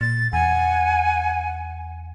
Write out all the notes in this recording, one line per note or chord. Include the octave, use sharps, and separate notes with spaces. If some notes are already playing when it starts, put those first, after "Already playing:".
A#2 A6
E2 F#5 G#5